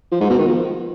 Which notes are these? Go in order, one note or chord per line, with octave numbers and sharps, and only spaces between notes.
F3
G#2
B2
D#3
F3